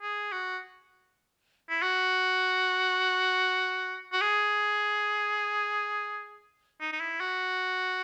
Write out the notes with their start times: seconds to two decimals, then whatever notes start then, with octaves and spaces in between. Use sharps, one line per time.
0.02 G#4
0.32 F#4
1.69 E4
1.82 F#4
4.13 F#4
4.21 G#4
6.81 D#4
6.93 D#4
7.00 E4
7.20 F#4